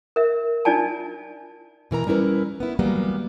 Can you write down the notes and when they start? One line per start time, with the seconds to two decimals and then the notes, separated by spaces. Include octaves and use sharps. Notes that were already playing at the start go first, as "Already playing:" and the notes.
0.16 A#4 E5
0.65 D4 D#4 F4 D5 G#5 A5
1.91 B2 E3 A#4 A#5
2.07 G3 C#4 E4 A#4 B4
2.60 B3 E4
2.79 E3 F#3 G3 A#3 B3